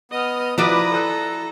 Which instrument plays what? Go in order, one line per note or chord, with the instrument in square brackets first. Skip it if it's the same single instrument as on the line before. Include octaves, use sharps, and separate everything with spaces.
[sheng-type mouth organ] B3 D#6 [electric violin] D#5 F6
[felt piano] F3 [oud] E4 F#4 D5 [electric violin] B4 D#6 [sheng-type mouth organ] A#5
[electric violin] A4 [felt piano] F#6